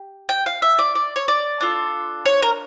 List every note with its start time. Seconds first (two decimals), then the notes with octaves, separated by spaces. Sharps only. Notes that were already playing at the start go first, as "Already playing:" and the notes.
Already playing: G4
0.29 G5
0.46 F5
0.62 E5
0.79 D5
0.95 D5
1.16 C#5
1.28 D5
1.61 D4 F4 A4
2.26 C#5
2.42 A#4